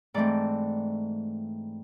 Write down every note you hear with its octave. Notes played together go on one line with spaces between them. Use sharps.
G#2 E3 A3 C4 D5